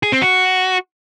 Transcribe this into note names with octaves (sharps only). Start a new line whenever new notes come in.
G#4
C4
F#4